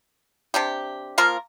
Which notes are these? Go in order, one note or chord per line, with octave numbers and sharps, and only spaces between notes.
C3 D4 G4
F3 A#3 F4 A#4